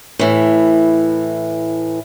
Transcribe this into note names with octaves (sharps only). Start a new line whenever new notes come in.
A2 E3